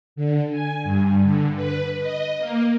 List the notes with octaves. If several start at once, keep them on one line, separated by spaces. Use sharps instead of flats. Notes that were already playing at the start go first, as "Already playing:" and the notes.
D3
G#5
G2
D3
B4
D#5
A#3